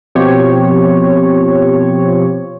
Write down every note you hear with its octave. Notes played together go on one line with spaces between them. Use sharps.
B2 F3 C4 G4 C#5